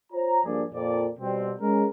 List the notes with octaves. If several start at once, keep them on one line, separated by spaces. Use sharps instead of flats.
F4 C5 C#5 A#5
G2 F3 A#3 D4 G#4 D5
F2 A#2 D5
B2 G3 C4
G#3 C#4 A#4